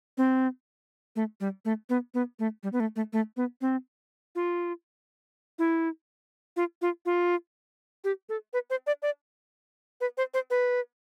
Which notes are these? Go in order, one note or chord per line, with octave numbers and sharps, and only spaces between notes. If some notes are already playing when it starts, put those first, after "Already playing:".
C4
A3
G3
A3
B3
B3
A3
G3
B3
A3
A3
A3
B3
C4
F4
E4
F4
F4
F4
G4
A4
B4
C5
D5
D5
B4
C5
C5
B4